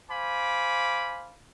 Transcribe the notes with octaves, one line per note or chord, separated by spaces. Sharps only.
C5 F5 G#5 B5 D6